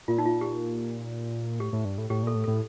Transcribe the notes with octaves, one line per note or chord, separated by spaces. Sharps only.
A#2 F4
D#4
F4
G4
A2 G4
A2
G2
A2
A2 G4
A#2 A4
A2
A4
A2